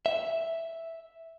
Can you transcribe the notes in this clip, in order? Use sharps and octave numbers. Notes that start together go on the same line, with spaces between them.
E5